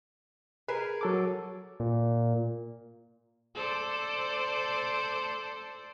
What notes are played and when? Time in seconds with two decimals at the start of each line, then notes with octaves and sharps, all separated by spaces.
0.68 G#4 A#4 B4
1.01 F#3 A4 D6
1.80 A#2
3.55 A4 C5 D5